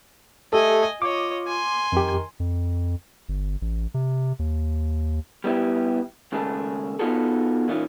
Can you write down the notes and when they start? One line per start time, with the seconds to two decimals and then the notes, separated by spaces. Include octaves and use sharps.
0.53 A3 G4 A4 D#5 G#5
1.02 F4 C#5 D#5 D6
1.47 G#5 C6
1.92 F2 D#3 G4
2.40 F2
3.29 G1
3.62 A1
3.94 C3
4.39 D#2
5.44 G3 B3 E4 G4
6.32 D#2 C#3 G#3 A3 G#4 A5
6.99 B3 D#4 F4 F#4 G#4 A4
7.68 A#2 E3 C#4 D#4 F4